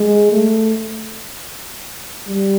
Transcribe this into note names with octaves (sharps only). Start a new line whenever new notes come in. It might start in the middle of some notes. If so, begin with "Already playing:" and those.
Already playing: G#3
A3
G3